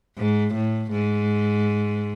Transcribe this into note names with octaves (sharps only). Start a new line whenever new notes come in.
G#2
A2
G#2